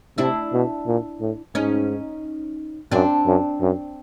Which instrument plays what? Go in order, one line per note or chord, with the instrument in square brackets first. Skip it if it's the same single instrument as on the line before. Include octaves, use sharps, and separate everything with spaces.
[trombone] C3 [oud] D4 E4
[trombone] B2
A#2
A2
[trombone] G#2 [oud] C#4 D#4
[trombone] F#2 [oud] C4 D4
[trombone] F#2
F#2